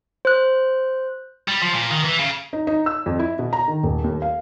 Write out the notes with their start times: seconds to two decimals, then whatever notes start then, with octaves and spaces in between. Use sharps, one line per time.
0.25 C5 F#6
1.48 G3
1.62 F3
1.74 A#2
1.91 D#3
2.05 E3
2.19 C#3
2.53 D#4
2.67 D#4
2.86 E6
3.06 F2
3.19 E4
3.39 B2
3.53 A#5
3.68 D#3
3.83 D#1
4.04 D#2
4.22 F5